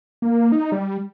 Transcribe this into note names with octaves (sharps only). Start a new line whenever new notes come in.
A#3
D#4
G3